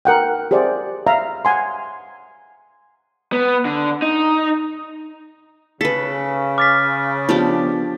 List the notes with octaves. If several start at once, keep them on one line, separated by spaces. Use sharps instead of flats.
A#4 F#5 G5
G4 G#4 C5 D5 E5
E5 F5 A#5
F#5 G#5 C6
B3
D3
D#4
C#3 A4 B4 B6
D6 F6 A6 B6
F3 B3 D4 G4